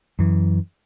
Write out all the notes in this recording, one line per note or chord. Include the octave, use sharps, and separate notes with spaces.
F#2 E3